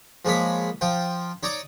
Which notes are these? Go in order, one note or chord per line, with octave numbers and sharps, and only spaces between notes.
F3 G#3 A#3 C#5 B5
F3 F4 G5
D#4 C#5 D5 A#5 D6 D#6